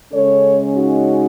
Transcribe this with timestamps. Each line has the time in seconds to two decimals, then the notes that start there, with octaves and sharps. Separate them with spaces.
0.13 C#3 G#3 C#4 A4 C#5
0.76 D#4 F#4